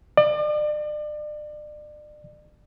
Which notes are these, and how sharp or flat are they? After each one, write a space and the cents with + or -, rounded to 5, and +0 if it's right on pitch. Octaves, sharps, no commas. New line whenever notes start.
D5 +35